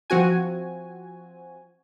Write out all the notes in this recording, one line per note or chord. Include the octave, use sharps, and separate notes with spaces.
F3 C4 F#4 G#5